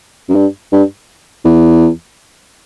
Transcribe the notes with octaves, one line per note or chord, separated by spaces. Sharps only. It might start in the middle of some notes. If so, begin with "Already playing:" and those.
F#2
G2
G2
E2